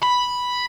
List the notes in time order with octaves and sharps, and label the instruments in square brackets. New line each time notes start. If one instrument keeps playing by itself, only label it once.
[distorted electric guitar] B5